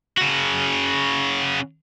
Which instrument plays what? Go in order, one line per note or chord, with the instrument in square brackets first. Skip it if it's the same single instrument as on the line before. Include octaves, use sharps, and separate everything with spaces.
[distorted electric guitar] C#3 F#4